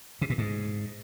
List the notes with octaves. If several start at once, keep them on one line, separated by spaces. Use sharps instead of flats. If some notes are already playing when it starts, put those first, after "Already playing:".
C3
A#2
G#2